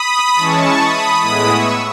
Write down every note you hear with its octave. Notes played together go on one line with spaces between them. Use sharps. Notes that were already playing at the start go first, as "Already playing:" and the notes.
Already playing: B5 D#6
E3 G#3 C#4 E4 A5 C#6
B5 D#6
A2 G#3 B3 E4 B5 D#6
C#6 E6